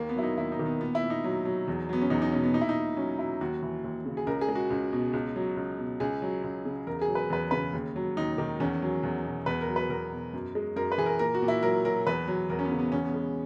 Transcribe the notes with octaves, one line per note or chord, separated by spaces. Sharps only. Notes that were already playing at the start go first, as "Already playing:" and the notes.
Already playing: D#2 D#3 A#3
B3
F#3 E4
D#4
D#2 E4
D#4
D#3
B3
A#2 B3
E4
A#2
D#4
F#3
F#3
E2
F#3 B3
C#4
E2 D#4
D#4
B2 C#4
B3
A#2 D#4
E4
D#4
A#2
F#3 C#4
F#3 E4
D#2 F#4
E3
D#2
C#3
G#4
C#2 A#4
G#4
G#3
F#4
C#2
B2
C#2
F#3
C#2
B2
C#2 G#4
F#3
C#2
C#3
E2 A#4
G#4
F#3
B4
E2 B4
C#3 B4
D#2
F#3
D#2 D#4
D#3
E2 C#4
F#3
E2
B2
E2 B4
A#4
F#3
B4
E2 A#4
B2
F#2
G#3
F#2 A#4
B4
E3 G#4
A#4
A#2 A#4
F#4
A#2
E4
F#3 A#4
F#3 A#4
E2 B4
F#3
E2 A#4
C#4
B3
C#3
B3
E2 C#4
B3
G#3